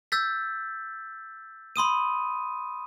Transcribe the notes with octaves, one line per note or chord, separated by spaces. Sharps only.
E6 G6 A6 B6
B5 C6 D#6 D#7